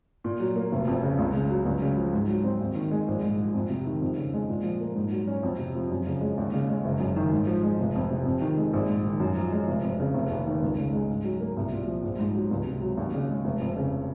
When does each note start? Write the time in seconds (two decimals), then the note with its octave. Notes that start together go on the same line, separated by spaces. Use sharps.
0.24 A#2
0.40 F#3
0.56 A#3
0.72 F1
0.87 F2
1.03 C#3
1.19 C#2
1.34 C#3
1.50 F#3
1.66 C#2
1.82 C#3
1.98 F3
2.13 G#2
2.29 F#3
2.44 C4
2.61 D#2
2.75 D#3
2.91 G#3
3.08 A#1
3.23 G#2
3.39 F3
3.54 F2
3.70 C3
3.86 D#3
4.02 F2
4.18 C#3
4.33 G#3
4.49 A#2
4.64 F3
4.80 A#3
4.96 G#2
5.12 F#3
5.27 C#4
5.43 F2
5.59 C3
5.75 F3
5.90 F#2
6.07 C#3
6.21 G#3
6.37 D#2
6.53 C#3
6.69 G#3
6.85 F#1
7.00 F#2
7.16 D#3
7.32 G#2
7.47 F3
7.63 G#3
7.79 F1
7.95 F2
8.11 C3
8.26 F2
8.41 D#3
8.57 G#3
8.73 A#1
8.89 G#2
9.05 D#3
9.20 F#2
9.36 F3
9.52 G#3
9.68 F1
9.83 F2
10.00 C#3
10.14 F1
10.30 D#2
10.47 D#3
10.62 C#2
10.78 C#3
10.93 G#3
11.09 G#2
11.24 F#3
11.41 A#3
11.57 C2
11.73 A#2
11.87 F3
12.03 A#1
12.19 G#2
12.35 F#3
12.51 C#2
12.67 C3
12.81 F#3
12.97 D#2
13.14 C#3
13.29 G#3
13.45 F1
13.61 F2
13.76 C#3